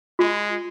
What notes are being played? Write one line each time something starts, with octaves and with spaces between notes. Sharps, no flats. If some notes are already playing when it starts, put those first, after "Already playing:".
G#3 F4